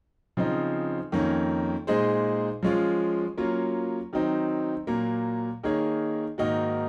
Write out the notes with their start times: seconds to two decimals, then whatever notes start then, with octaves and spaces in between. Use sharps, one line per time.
0.37 C#3 F3 C4 D#4
1.12 F2 D#3 A#3 C#4
1.87 A#2 G#3 D#4 G#4 C5
2.63 F3 G#3 C#4 F4
3.38 F#3 A#3 C#4 F4
4.13 D#3 F#3 C4 D#4
4.87 A#2 F#3 A#3
5.63 D#3 A#3 D#4 G#4 C#5
6.38 G#2 D#3 A#3 D#4 F#4